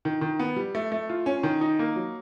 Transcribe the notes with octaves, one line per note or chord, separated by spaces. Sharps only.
D#3
D#3
B3
G3
A3
A3
F4
C#4
D#3
D#4
A#3
F#3